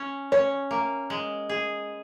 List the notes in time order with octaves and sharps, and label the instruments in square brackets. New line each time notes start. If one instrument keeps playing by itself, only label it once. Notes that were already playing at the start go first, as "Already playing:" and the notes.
Already playing: [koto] C#4
[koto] C#4 [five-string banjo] C#5
[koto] A#3
G#3
G#4